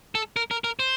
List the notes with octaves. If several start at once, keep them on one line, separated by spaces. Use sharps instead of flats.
A4
A#4
A#4
A#4
C5